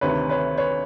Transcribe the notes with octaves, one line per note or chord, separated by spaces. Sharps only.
D2 C3 D#3 B4 C#5
B4 C#5
B4 C#5